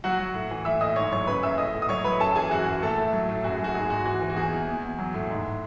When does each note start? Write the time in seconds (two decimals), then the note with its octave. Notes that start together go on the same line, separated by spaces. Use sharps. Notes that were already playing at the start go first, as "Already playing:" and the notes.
0.04 F#3 F#4 F#5
0.19 F#3
0.34 A2
0.51 E3
0.65 A2 E5 E6
0.81 A2 D#5 D#6
0.96 G#2 C#5 C#6
1.12 F#3 C#5 C#6
1.27 C#3 B4 B5
1.43 F#2 E5 E6
1.58 A2 D#5 D#6
1.74 A2
1.82 D#6
1.89 F#3 C#5 C#6
2.04 F#3 B4 B5
2.20 F#2 A4 A5
2.35 E3 G#4 G#5
2.51 F#2 F#4 F#5
2.66 F#2
2.82 A2 A3 A4
2.98 A2
3.13 F#3
3.29 A2
3.44 F#2 F#4
3.55 G#4
3.60 F#3 F#4
3.75 G#2 G#4
3.90 G#2 F#4
4.06 E3 F#4
4.21 E3
4.30 F#4
4.36 E2 G#4
4.53 E2
4.68 E2
4.84 E2
4.98 F#3
5.14 A2
5.30 G#2